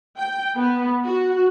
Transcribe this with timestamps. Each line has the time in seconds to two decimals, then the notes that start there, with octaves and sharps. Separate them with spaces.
0.18 G5
0.56 B3
1.05 F#4